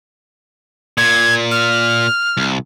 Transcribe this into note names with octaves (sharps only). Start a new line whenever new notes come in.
A#2 G#6
F6
C2